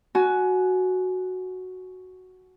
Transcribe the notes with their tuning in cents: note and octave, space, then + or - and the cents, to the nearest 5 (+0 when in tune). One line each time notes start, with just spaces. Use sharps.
F#4 +0 G#5 +25